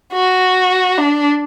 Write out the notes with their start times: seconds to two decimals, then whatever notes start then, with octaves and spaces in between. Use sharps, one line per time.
0.13 F#4
0.98 D4